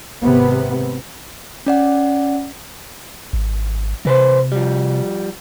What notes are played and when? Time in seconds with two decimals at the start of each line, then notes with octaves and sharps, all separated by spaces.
0.22 G#1 C3 B3
1.66 C#4 D5 F#5
3.33 G#1
4.05 C3 E3 B4 C5
4.52 F3 G3